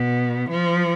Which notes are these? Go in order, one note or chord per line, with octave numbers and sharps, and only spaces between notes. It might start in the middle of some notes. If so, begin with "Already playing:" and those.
Already playing: B2
F3